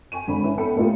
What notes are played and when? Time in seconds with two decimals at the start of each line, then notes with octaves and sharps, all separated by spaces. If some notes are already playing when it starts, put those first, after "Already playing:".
0.12 G5 G#5 C#6 D#7
0.27 G#1 D3 B5
0.43 C#4 E4 B4
0.58 B3 A4 G5 B5 C#7
0.76 A2 A#3 B3 D#4 F4 G4